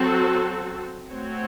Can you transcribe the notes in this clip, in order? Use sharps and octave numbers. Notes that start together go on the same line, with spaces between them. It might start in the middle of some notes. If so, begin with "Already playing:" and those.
Already playing: F#3 C4 F#4 A4
A3 C4 F#4 C#5